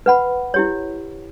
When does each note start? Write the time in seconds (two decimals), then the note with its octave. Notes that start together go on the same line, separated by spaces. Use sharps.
0.06 B4 F#5 B5
0.54 E4 G4 C#5